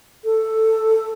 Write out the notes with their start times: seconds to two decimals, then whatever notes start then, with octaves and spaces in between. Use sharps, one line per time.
0.25 A4